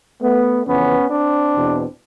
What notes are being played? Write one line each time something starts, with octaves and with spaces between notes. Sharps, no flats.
A3 B3
F2 C#3 E3 B3 C#4
C4 D4
E2 B2